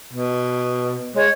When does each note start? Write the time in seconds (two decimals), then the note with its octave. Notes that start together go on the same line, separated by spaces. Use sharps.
0.13 B2
1.16 G#3 C#5